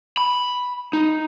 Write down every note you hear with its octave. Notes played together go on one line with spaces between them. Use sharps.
B5
D#4